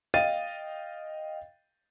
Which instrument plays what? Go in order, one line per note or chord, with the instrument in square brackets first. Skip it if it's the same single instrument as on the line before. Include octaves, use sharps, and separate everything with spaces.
[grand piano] D#5 F5 G5 A6 D#7